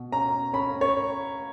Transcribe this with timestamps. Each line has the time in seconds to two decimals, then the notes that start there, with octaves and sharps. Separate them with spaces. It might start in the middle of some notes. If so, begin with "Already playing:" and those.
Already playing: B2
0.12 C#4 A#5
0.53 C#4 B5
0.81 C#5